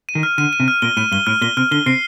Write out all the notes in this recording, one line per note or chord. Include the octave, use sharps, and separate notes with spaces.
D#7
D#3
F6
D3 D#7
D#7
C3
F6
A#2 G7
A2 D#7
G2 G7
A2 F6
A#2 G7
C3 F6
D3 G7
C3 C7